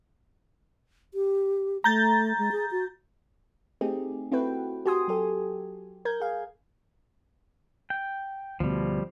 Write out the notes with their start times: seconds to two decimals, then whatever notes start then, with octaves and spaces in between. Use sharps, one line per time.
1.14 G4
1.84 A3 A#5 G6 A6
2.38 G#3
2.52 G#4
2.71 F#4
3.81 A3 C4 D#4 G4 G#4
4.32 C4 E4 F#4 A4 B4 G5
4.86 F#4 G4 G#5 C6 D#6
5.08 F#3 G4 A4
6.05 A#4 G6 G#6
6.20 G#4 F5
7.90 G5
8.60 D2 B2 F3 G3